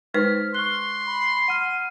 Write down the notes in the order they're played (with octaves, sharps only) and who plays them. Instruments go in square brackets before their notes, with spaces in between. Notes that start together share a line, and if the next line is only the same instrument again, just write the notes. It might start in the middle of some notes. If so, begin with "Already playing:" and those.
[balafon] G#3 D#4 B4 [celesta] C5 B6 [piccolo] F6
[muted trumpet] C6 [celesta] C#6 F#6 [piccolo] G7
[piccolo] B5
[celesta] F#5 F6 C7 [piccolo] D#7